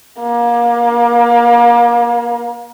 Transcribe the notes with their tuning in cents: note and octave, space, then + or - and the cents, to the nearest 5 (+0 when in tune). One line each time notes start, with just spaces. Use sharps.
A#3 +30